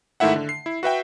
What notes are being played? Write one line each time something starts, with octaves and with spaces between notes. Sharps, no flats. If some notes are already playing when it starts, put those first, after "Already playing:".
G#2 D#3 A3 E4 E5 F#5
D3
C7
E4
F#4 B4 E5 G5